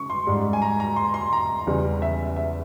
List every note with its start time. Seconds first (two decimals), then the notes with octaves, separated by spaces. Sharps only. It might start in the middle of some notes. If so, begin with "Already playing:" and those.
Already playing: C#3 C#6
0.10 C6
0.27 G#2 G3
0.53 G#5
0.62 A#5
0.80 A#5
0.96 C6
1.14 C6
1.33 A#5
1.67 E2 C#3 G3
2.02 E5
2.36 E5